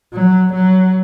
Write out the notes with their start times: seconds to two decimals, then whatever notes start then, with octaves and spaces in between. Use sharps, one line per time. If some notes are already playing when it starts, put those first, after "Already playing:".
0.14 F#3
0.54 F#3